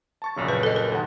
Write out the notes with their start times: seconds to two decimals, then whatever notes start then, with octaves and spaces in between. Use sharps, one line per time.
0.22 A5 C#6 A6
0.36 A#1 F#2 C#3
0.48 B4
0.63 A4 D#5
0.76 A#4
0.92 D#2 F#5